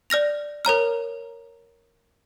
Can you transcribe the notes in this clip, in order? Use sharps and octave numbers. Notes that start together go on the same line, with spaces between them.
D5 F6 A#6 F7
A#4 C#5 A#5 F6